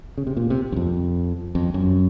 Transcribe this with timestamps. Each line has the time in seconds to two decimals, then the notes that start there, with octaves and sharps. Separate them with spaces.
0.18 C#3
0.27 C3
0.37 A#2
0.50 C3
0.72 F#2
0.76 F2
1.55 F2
1.74 F#2